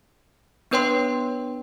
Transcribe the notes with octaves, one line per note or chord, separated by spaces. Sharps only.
B3 D4 B4 C#5 G5 C6